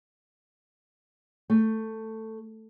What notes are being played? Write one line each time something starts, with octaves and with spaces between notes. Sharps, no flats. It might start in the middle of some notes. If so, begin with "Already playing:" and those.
A3